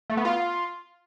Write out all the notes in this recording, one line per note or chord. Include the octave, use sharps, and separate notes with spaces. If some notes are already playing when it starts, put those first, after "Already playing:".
A3
B3
F4